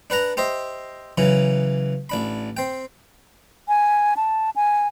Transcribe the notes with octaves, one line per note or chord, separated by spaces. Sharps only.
D4 B4 F#5 A#5
G4 C5 D#5 E5
C#3 E3 F#3
A1 D4 B5
C4 G5
G#5
A5
G#5